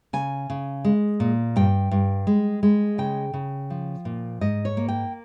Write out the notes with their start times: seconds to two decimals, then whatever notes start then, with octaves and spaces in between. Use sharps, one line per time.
0.13 C#3 G#5
0.50 C#3
0.85 G#3
1.20 A#2
1.56 G2 G5
1.91 G2
2.27 G#3
2.63 G#3
2.98 C#3 G5
3.34 C#3
3.70 F3
4.05 A#2
4.41 G#2 D#5
4.65 C#5
4.77 A#3
4.89 G5